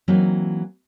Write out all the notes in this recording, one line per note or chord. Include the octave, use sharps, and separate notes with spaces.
E3 F#3 A#3 C4 D#4